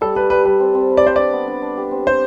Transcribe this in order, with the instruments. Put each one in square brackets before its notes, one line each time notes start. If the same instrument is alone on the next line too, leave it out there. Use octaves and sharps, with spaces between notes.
[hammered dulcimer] G3 [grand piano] A4
[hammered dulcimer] A4 [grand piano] B4
[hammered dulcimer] G3 [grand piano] B4
[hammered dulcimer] G3 [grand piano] B4
[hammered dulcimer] C4
C4
B4
[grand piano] D5
[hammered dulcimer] B4 [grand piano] C5
[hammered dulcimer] D4 [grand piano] D5
[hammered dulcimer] B3
D4
D4
G4
C4
[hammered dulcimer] G4 [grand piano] C5